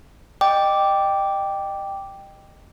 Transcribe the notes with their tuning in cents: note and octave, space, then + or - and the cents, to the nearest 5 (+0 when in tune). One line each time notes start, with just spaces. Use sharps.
D#5 -25 G5 +0 D6 -5